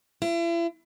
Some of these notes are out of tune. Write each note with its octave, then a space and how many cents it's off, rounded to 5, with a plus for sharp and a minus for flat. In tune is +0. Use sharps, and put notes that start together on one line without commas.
E4 +40